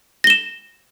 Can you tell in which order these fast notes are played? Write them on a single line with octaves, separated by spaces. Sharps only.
A#6 G7 E7